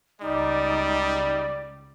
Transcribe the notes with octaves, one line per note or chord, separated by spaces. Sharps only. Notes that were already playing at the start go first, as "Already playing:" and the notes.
C#2 G3 D#4 D5